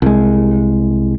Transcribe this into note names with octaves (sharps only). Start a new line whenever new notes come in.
C2 G#3